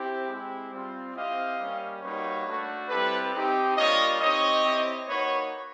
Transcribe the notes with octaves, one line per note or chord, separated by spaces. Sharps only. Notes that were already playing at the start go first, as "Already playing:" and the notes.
Already playing: C4 E4 G4
G#3 C4 E4 G4
G3 C4 F4
C4 E4 G4 D#5 F5
G3 A#3 C#4
G3 A#3 D#4 F#4 B4 C#5
A3 D4 F#4
G3 C4 E4 G4 A4 B4
C4 D#4 G4
G3 A#3 D4 F4 C#5 D#5
C4 D#4 G4 C#5 D#5
C4 E4 G4
A#3 D#4 F#4 B4 C#5